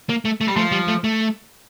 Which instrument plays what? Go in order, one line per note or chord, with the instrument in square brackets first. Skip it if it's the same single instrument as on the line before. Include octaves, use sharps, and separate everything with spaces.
[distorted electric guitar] A#3
A3
A3
[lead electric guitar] G3
[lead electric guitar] F3 [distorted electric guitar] A3
[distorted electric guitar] G3
A3
A3